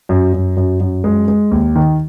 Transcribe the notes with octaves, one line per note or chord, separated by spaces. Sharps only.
F#2
F#2
F#2
F#2
G#3
G#3
D#2
D#3